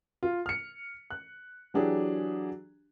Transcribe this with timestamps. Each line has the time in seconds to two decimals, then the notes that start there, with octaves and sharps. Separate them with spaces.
0.23 F4
0.46 F6 C#7
1.10 F#6
1.74 E3 F#3 D4 G4 G#4